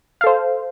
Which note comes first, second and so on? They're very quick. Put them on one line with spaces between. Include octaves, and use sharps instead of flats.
F5 A4 C5